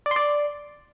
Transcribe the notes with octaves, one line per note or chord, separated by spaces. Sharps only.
D5
C6
D5